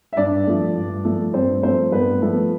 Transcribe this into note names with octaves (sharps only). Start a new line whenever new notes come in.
E5
G2 D4 D5
F3 A3
G2
F3 A3
G2 C4 C5
F3 A3 C4 C5
G2 B3 B4
F3 A3